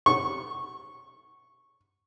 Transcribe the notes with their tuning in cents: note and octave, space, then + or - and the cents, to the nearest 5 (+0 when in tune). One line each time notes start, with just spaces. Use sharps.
C#6 -10